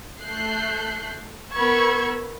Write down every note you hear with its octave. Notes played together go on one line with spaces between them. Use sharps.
A3 F#6 G6 C7
B3 A#4 B5 C#6 E6 G#6